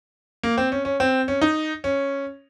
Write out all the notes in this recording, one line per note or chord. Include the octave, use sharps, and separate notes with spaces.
A#3
C4
C#4
C#4
C4
C#4
D#4
C#4